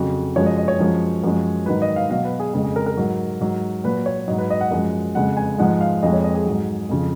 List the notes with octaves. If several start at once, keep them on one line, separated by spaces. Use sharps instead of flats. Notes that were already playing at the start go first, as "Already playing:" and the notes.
Already playing: F2 C#3 F#3 F#4
F#2 F3 G#3 C#5
D#5
D#5
C#5
F#2 F3 G#3
F#2 F3 G#3
G#2 D#3 F#3 B4
D#5
F5
B2 F#3 F5
B4
G#4
F2 C#3 G#3 G#4
G#4
A#4
A#4
G#2 F#3
G#2 F#3
A#2 F#3 B4
C#5
G#2 F#3 D#5
B4
D#5
F#5
F#2 F3 G#3
F2 C#3 G#3 F#5
G#5
G#2 F3 G#3 F#5
F5
F2 F3 G#3 D#5
C#5
D#5
G#4
G#2 F#3
F2 C#3 F3